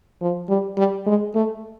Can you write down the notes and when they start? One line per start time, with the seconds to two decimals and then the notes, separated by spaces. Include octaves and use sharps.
0.21 F3
0.49 G3
0.77 G3
1.06 G#3
1.35 A3